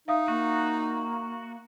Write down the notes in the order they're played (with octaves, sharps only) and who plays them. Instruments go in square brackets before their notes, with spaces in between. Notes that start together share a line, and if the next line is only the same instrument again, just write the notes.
[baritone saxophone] D#4 [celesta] E5 F5 D#6
[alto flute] A#3 [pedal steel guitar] F#4